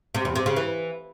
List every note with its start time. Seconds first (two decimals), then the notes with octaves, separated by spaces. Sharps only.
0.15 C3
0.25 E2
0.35 C3
0.46 C#3
0.56 E3